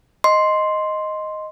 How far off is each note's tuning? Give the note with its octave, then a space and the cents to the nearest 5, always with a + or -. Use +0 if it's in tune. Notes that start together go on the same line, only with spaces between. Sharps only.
D#5 +0 C6 +0